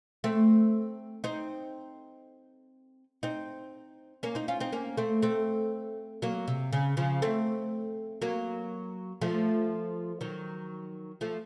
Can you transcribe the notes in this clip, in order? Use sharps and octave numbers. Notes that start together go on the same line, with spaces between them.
A3 C4
C4 D#4
C4 D#4
A#3 C#4
C4 D#4
C#4 F4
C4 D#4
A#3 C#4
A3 C4
A3 C4
F#3 A#3
C3
C#3
C#3 F3
A3 C4
F#3 A#3
F3 A3
D#3 F#3
F3 A3